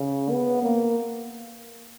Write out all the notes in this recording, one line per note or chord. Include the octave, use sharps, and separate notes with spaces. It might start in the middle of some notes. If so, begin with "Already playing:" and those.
Already playing: C#3
B3
A#3